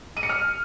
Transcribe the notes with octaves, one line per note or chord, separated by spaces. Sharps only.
D#7
C#7
F6